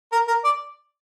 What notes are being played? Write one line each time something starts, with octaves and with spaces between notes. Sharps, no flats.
A#4
A#4
D5